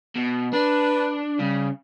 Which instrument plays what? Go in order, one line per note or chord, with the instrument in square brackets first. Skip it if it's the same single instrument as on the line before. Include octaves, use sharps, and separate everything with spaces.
[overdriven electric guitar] B2
[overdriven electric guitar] D4 [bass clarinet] B4
[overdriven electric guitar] C#3 [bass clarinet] G3